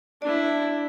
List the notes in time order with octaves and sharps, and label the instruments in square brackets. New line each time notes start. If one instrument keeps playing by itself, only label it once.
[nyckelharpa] D4 E4 [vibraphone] D5